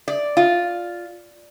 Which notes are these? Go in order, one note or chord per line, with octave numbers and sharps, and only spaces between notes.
D5
F4